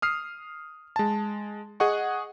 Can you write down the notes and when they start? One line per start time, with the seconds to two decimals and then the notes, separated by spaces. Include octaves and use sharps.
0.02 D#6 F6 C7
0.96 G#3 A5
1.80 G#4 D#5 F#5 C#6